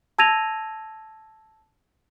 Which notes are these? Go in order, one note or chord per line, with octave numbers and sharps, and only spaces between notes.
A5 E6 G#6 A#6 D#7 F7